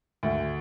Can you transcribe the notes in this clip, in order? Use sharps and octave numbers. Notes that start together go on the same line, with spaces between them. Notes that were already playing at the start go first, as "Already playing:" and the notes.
D2